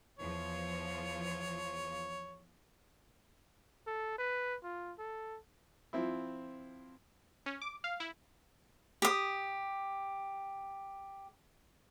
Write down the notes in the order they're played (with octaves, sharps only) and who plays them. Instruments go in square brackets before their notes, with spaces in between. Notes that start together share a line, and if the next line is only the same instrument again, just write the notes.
[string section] E2 F3 F4 [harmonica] C#5
[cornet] A4
B4
F4
A4
[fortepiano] F3 C4 E4
[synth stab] C#4
D6
F5
E4
[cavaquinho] G4 D#6